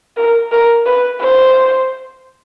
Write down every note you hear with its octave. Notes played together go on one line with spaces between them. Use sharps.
A#4
A#4
B4
C5